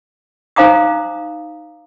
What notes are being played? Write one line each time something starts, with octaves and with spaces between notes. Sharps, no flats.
D#4 C5 F5 A#5 D6 D#6